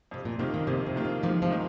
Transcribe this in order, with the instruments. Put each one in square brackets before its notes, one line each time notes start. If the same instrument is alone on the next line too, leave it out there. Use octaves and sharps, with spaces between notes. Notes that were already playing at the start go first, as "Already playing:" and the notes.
[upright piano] F2 [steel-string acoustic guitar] C3
[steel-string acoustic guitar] A#2
[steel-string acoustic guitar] C3 [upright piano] D#3 A#3 F4
[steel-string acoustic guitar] A#2 D#3
[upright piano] F2 [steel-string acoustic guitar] C3
[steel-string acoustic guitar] C3
[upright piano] D#3 A#3 F4
[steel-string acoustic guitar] C3
[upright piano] G#2 [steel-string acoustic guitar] C3 F3
[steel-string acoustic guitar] C3 F3
[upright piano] D#3 A#3